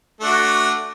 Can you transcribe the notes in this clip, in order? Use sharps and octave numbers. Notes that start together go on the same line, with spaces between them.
A3 D4 F#4